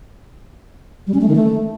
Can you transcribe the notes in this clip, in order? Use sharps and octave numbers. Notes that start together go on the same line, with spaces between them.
G3
C#4
A3
D#3
A3